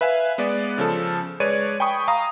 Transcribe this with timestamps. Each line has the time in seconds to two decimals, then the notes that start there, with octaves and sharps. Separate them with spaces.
0.01 B4 E5 F5 G#5
0.38 G#3 B3 B4 D5
0.78 C#3 F3 A4
1.40 G#3 B4 C#5 D5 D#7
1.80 G5 G#5 B5 C#6 D#6
2.08 F5 A#5 D#6